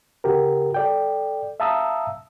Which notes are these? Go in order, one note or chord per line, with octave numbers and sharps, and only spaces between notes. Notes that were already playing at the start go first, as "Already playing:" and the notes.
C#3 F#4 G4 A#4
A4 D5 G5
E5 F5 A5 A#5 D#6 E6